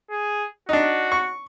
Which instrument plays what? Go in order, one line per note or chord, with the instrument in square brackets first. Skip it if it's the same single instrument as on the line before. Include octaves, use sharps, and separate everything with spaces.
[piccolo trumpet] G#4
[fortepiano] D4 D#4 [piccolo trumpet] F#4
[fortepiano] C#6